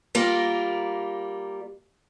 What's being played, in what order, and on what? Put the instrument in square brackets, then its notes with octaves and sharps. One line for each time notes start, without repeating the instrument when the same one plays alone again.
[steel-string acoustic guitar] G3 A#3 F4 A#4